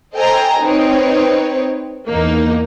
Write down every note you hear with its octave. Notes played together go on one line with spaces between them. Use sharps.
A4 C5 D#5 G5 G#5 A#5
C4 D#4 B4 C#5
E2 A#3 D#4